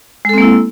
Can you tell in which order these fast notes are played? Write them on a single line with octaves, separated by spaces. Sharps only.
G#3 A4 C4 A#3 E4